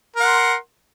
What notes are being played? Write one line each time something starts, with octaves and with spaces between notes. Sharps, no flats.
A#4 F#5 C6